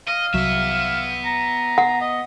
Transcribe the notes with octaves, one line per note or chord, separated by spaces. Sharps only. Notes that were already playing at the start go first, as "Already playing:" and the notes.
D#5 F5
C2 F#3 B3 E5
A#5
F#5
D#5